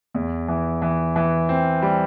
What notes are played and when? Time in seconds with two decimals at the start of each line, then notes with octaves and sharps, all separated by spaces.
0.14 E2
0.48 E3
0.82 E3
1.16 E3
1.49 C4
1.82 G3